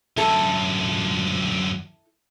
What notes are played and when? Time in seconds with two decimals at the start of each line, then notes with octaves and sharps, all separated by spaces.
0.17 F#2 D3 E4 A4